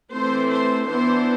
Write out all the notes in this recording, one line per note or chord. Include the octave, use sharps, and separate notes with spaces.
E3 A3 C4 C5
C5
E3 B3 D4 C5